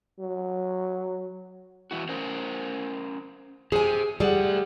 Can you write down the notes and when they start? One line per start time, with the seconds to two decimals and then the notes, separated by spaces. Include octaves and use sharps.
0.19 F#3
1.91 E2 E4 F#4
2.09 C#4 A#4 C5
3.72 G4 G#4 C5 G#5
4.20 G3 A3 G#4 F#5